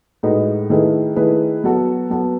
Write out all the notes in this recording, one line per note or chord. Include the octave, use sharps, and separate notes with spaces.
A2 G#3 D#4 F#4 B4
D#3 A3 E4 G#4 B4
D#3 A3 E4 G#4 B4
F#3 B3 F#4 A4
F#3 B3 F#4 A4